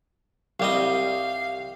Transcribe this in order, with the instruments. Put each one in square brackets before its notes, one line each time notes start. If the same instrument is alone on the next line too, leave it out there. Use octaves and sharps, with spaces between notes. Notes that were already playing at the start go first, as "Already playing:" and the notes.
[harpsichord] C2 G3 D#5 [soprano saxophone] F5